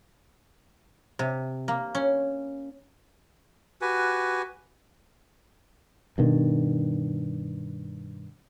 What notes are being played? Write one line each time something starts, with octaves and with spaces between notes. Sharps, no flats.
C3
A#3
C#4
F#4 G4 B4 G#5
G2 B2 D3 D#3